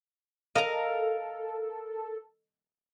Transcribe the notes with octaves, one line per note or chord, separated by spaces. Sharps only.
A4 A#4 D#5 F5 A#5